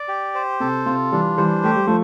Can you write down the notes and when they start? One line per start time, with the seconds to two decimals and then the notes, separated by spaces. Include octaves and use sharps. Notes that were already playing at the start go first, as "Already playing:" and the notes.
Already playing: D5
0.08 G4
0.35 C5
0.60 C3 A4
0.86 C3 F4
1.12 E3 G3 D4
1.38 E3 G3 C5
1.64 A3 G4
1.76 G3
1.87 F3 A3